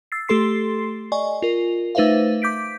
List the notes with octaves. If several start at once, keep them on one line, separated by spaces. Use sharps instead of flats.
E6 A6 C7
A3 G4 A4 C6 C7
D5 D#5 G#5 C#6
F4 A#4
A3 D#4 B4 C5 E5 F5
D6 G6 B6 D7